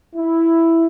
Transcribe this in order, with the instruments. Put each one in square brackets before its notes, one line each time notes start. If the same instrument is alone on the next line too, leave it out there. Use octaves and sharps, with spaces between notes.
[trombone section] E4